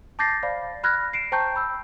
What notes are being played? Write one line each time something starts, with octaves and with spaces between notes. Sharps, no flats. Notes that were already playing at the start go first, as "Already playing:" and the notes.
A5 D6 G6 A6 A#6 C7
C5 D5 F5 B5
B5 F6 F#6 G#6 A#6
C7 D7 E7
C5 G5 A5 A#5 C#6 G6
B5 E6 G6